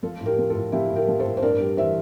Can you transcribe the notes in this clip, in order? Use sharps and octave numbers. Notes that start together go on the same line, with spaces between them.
F3 F4 A4
A2
G4 A#4
F3
A2 F4 A4
F3 E4 G4
A2
G4 A#4
F3
A4 C5
A2
C5
G2 A#4 D5
G3
E3 C5 E5